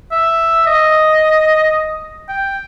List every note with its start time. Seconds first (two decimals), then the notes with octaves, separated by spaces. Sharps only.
0.12 E5
0.67 D#5
2.29 G5